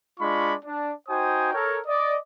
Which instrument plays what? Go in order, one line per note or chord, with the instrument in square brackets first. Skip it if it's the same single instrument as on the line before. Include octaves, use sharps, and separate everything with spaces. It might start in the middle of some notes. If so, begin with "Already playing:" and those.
[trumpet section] G#3 D4 F4 D5 B5 C#6
D4
D#4 F#4 C5 G5 G#5 D#6
A4 A#4 C#5
D5 D#5